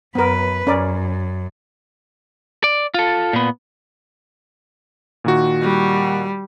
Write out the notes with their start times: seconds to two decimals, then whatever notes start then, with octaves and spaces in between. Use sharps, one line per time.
0.15 F#2 B3 A#4 B4
0.67 F#2 C#4 A#4 D5
2.64 D5
2.94 F4 A4
3.33 A#2 B3
5.24 A#2 D#3 F#4
5.62 G3